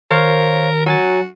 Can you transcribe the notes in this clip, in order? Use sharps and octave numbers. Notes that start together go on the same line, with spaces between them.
D#3 A#4 C5 C#5 F5
F#3 F#4 G#5 A6